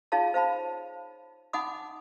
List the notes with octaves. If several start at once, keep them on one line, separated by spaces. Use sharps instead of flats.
D#4 F4 G#4 C#5 F5 A5
C5 F5 A5 B5
D#4 F#5 G#5 B5 D6 D#6